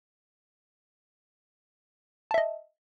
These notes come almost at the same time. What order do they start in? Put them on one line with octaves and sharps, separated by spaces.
A5 E5 D#5